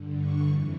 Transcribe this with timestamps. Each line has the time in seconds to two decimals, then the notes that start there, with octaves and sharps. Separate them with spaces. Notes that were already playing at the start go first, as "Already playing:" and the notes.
Already playing: G2 D3
0.16 C#6
0.45 F2 E3